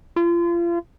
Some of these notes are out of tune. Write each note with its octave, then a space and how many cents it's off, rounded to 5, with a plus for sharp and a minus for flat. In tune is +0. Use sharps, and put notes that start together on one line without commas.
F4 -35